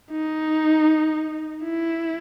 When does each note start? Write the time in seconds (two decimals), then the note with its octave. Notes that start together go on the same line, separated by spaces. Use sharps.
0.11 D#4
1.63 E4